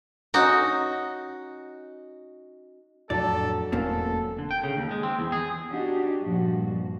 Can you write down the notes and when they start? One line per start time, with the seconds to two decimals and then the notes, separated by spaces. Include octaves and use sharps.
0.34 C#4 D#4 F#4
3.10 F2 A2 F#3 D4 A4 D5 A5
3.72 E1 A2 A#3 C4 C#4 A4
4.39 D3
4.51 G5
4.63 C#3
4.77 D#2
4.91 G#3
5.03 C4
5.19 E2
5.32 G#4
5.71 D4 D#4 F#4 G4
6.23 G2 A#2 F3 F#4